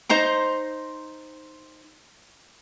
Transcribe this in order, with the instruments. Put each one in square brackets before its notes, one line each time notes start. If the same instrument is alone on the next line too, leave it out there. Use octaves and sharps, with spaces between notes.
[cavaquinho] D#4 C5 A#5 C6